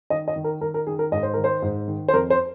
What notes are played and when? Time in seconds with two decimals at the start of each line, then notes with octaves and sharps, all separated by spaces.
0.10 D#3 D#5
0.28 D#5
0.36 D#3
0.44 A#4
0.61 D#3 A#4
0.74 A#4
0.87 D#3 G#4
0.99 A#4
1.12 G#2 D#5
1.23 C5
1.34 D#3 A#4
1.44 C5
1.62 G#2
1.88 D#3
2.08 C5
2.13 F2 A#4
2.30 C5